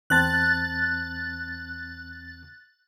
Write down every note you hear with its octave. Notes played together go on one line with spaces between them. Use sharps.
E2 C4 A5 F#6 A6